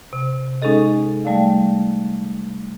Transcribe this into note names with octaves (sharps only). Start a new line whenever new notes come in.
C3
G#3 C#4 D#4 G#4 A4 D#5
G3 A3 D5 F5